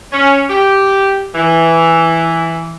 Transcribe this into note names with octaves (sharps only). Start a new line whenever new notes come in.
C#4
G4
E3